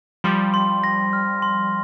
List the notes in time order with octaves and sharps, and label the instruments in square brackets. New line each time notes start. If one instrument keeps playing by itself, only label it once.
[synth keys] F3 G3 [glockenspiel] C6
[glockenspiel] C6
A#6
F6
C6